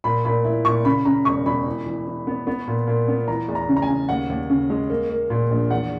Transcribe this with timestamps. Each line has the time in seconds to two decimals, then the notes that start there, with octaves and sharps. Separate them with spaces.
0.04 A#2 B5
0.25 A#2 B5
0.45 E4
0.65 A#2 C#6
0.85 C#3 B5
1.05 C#3 A#5
1.25 E1 C#6
1.46 E1 B5
1.66 E3
1.86 E3
2.07 E3
2.27 B3
2.47 B3
2.68 A#2
2.87 A#2
3.08 B3
3.28 E3 A#5
3.48 E2
3.55 A#5
3.69 C#3
3.76 A#5
3.82 G#5
3.89 C#3
4.09 D#2 F#5
4.30 D#2
4.50 C#3
4.70 G#3
4.90 A#3
5.10 A#3
5.30 A#2
5.50 A#1
5.70 E2 F#5